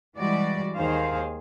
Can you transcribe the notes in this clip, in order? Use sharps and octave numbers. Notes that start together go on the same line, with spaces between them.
E3 G3 G#3 F#4 D5
D#2 D#3 G#4 C5 F5